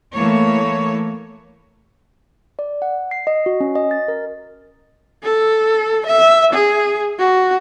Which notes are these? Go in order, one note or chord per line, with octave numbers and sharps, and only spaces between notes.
E3 A3 A#3 C#5
D5
F#5
C7
D#5
F#4
C#4
D#5
A6
A#4
A4
E5
G#4
F#4